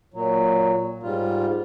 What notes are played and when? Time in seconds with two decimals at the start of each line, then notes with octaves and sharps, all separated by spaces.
0.14 A#2 F#3
1.03 G#2 G3 F4